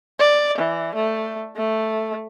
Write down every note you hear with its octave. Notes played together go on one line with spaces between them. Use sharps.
D5
E3
A3
A3